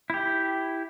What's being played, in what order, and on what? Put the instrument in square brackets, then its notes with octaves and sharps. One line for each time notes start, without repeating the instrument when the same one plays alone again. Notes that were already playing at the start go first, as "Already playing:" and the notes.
[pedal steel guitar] E4 G4